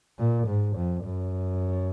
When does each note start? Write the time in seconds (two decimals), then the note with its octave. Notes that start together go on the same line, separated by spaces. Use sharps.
0.19 A#2
0.47 G#2
0.76 F2
1.05 F#2